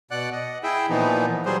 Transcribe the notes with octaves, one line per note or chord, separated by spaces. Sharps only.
B2 D5 F#5 F#6
D#5 F#5
E4 G#4 E5 G5
A#2 E3 F3 B3 D#4
F#3 G3 G#4 C5